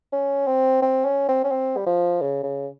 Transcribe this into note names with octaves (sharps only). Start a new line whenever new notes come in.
C#4
C4
C4
C#4
C4
C#4
C4
G3
F3
C#3
C#3